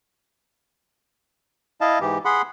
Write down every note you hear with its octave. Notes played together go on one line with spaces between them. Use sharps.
E4 D#5 F5 A5
G#2 E3 G4
G#4 F#5 B5 C6